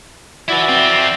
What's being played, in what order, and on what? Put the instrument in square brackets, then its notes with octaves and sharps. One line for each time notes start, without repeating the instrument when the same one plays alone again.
[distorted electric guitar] E4 B4 [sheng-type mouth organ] F#4 D5 E5
[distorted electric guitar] F2 C4